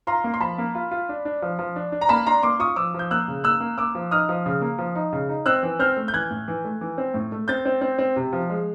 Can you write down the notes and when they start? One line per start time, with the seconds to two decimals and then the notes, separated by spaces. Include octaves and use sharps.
0.07 F4 A#5 C6
0.24 A#3
0.34 C6
0.41 F3 A5 B5
0.58 A#3
0.75 F4
0.91 F4
1.09 D4
1.25 D4
1.42 F3
1.59 F3
1.76 D4
1.92 D4
2.01 A#5
2.09 A#3 A5 B5
2.26 D4 A#5 C6
2.43 A#3 C6 D6
2.59 F4 C#6 D#6
2.76 F3 D6 E6
2.94 F3 G6
3.11 A#3 E6 F#6
3.28 C#3
3.44 A#3 E6 F#6
3.60 A#3
3.77 A#3 D6 E6
3.95 F3
4.11 D#4 D#6 F6
4.29 F3
4.46 C#3
4.61 A#3
4.78 F3
4.95 D#4
5.13 C#3
5.29 D#4
5.46 C4 E6 F#6
5.63 E3
5.79 C4 F6 G6
5.97 A3
6.08 G6
6.13 E3 F#6 G#6
6.30 A2
6.48 E3
6.65 A3
6.81 E3
6.98 C4
7.14 A2
7.32 A3
7.48 C4 G6 A6
7.65 C4
7.81 C4
7.99 C4
8.16 C3
8.33 F3
8.50 G#3